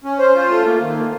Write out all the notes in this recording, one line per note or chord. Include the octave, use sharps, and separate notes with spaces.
C#4
C5
F4
A3
A#3
D#3
A#3